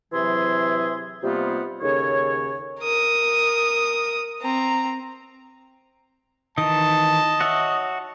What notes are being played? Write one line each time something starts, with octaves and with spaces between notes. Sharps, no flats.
C3 E3 F#3 G#4 E5 C6
C3 G3 A#3 B3 D#4 F4
D#2 C#3 A4 C#5
A#4 D#6
C4 A#5
D#3 E3 D#5 A5
F#4 C#5 E5